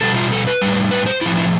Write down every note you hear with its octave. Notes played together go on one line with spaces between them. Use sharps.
B2 G3 A4
F4
A4
B4
A2 G3
B4
C5
A2 F3 E4
E4